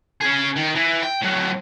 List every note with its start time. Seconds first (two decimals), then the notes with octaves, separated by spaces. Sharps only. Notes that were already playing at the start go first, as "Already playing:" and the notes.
0.21 C#4 G#4
0.56 D#3
0.75 E3
1.03 G5
1.22 A2 F#3